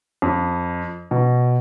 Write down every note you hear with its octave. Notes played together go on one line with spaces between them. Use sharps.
F2
B2